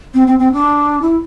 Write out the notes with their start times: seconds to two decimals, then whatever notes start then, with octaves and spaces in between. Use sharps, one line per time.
0.14 C4
0.27 C4
0.39 C4
0.52 D4
1.02 E4